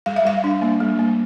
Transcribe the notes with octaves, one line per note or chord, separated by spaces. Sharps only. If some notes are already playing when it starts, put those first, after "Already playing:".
G3 F5
E5
G3 F5
D4
A#3
G3
A#3